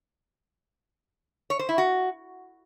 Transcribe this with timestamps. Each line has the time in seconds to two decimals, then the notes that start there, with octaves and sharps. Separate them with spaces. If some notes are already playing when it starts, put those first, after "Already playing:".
1.50 C#5
1.59 C5
1.69 E4
1.78 F#4